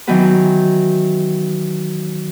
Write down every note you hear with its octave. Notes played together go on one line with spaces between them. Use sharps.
D#3 E3 F#3 B3 F#4 B4